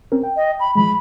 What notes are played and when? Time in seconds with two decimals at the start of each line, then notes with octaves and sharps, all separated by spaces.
0.12 C4 C#4 A#4
0.23 G5
0.36 D#5
0.59 B5
0.75 E3 F3 G#3 B5